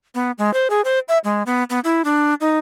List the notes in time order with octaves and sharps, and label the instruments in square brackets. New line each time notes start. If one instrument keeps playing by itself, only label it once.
[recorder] B3
G#3
C5
G#4
C5
E5
G#3
B3
B3
E4
D4
D#4